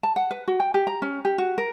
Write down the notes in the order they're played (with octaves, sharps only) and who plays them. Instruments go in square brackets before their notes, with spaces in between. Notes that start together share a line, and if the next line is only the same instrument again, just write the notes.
[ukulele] A5
F#5
B4
F#4
G5
G4
A#5
C#4
G4
F#4
A#4